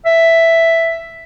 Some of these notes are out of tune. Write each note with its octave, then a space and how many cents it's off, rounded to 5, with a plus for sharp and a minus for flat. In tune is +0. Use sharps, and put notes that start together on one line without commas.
E5 +5